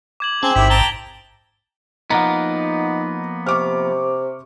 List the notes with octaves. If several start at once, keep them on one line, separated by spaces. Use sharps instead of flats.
D6 G#6 F#7
C4 C#4 G#4 G5 A5
A1 G#2 D#3 E4 G4 B6
G5 A5 A#5 D7 F#7 G7
F3 A#3 B3 D#4 F#5 A#5
C3 C#6 D6 F6